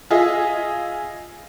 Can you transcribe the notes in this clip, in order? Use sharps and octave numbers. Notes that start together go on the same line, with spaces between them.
F4 G#4 D#5 E5